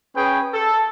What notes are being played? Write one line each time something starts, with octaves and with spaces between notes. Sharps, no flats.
C#4 G#4 B4 G5
A4